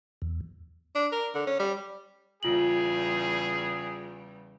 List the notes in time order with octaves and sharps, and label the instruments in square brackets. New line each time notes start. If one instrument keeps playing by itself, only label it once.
[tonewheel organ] E2
[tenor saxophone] D4
A#4
D3
C#4
G3
[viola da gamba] E2 C#3 G3 [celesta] F4 F#7 [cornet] G#4